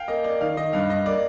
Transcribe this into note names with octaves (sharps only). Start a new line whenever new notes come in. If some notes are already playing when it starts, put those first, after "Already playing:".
Already playing: F5 G5 G#5
A#3 D#5
A#3 D5
D#3 F5
D#3 D#5
G2 F5
G2 D#5
A#3 D5